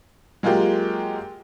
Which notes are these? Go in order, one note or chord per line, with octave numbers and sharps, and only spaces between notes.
F#3 G#3 A#3 F4 G4